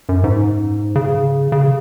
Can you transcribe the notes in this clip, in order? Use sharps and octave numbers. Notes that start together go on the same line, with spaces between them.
F#2
G#2
C#3
C#3